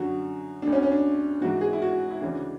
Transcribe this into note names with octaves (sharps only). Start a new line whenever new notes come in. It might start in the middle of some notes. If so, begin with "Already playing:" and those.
Already playing: F#2 D3 F#4
D2 D3 D4
C#4
C#4
D4
G#2 E3 F#4
G#4
E4
F#4
E4
D2 C#3 E3 D4